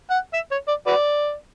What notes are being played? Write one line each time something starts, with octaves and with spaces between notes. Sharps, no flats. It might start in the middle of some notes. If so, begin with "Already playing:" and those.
F#5
E5
C#5
D5
F#4 B4 D5